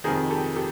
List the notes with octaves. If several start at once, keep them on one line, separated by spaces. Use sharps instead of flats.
F2 C3 D#3 G#4 A#4
G4 A4
G4 A4